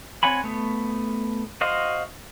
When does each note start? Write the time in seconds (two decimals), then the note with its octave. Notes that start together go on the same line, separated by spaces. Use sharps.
0.23 C4 C#5 F#5 G#5 B5
0.44 A3 B3
1.61 F#4 C5 D#5 F5